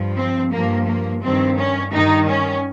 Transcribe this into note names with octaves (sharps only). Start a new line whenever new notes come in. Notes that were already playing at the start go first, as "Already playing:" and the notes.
Already playing: G2 F3
C4
G2 F3 A#3
A#3
G2 D#3 C4
C#4
G2 D#3 D#4
C#4